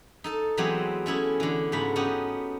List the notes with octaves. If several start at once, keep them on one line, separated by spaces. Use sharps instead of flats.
D#4 A4 A5
E3 F#3 G#3 B3 C4 G4
A3 C#4 E4 G#4
D3 E3
G#2 C#3 A3 F#4 B5
B3 C#4 D#4 F#4 G4